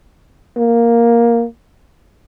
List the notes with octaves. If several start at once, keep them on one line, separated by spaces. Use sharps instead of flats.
A#3